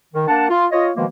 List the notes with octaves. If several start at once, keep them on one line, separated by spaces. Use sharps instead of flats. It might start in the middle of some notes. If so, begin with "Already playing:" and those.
D#3
A#3 D4 F#5 A5
F4
F4 C#5 D#5
B2 D#3 F3 G#3 A#3